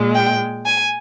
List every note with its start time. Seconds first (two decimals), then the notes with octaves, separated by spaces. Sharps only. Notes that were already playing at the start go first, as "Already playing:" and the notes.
Already playing: A#2 G#3
0.15 G5
0.65 G#5